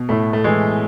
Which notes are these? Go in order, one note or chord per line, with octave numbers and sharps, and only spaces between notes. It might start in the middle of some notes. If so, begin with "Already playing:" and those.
Already playing: B2
A2 A3
A3
E3 G#3